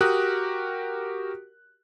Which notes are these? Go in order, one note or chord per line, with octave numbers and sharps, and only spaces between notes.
F#4 G4 A#4 D#6 F#6